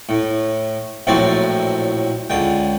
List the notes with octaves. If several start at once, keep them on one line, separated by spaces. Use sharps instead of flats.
A2
A#1 A2 F#3 C4 D5
C#2 D3 G5